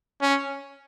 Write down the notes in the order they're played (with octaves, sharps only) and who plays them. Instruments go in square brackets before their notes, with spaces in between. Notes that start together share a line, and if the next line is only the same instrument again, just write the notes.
[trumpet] C#4